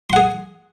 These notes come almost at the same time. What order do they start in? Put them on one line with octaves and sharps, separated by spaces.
C6 F#5 G#4